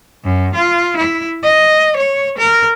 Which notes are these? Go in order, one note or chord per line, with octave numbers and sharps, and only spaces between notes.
F#2
F4
E4
D#5
C#5
A#4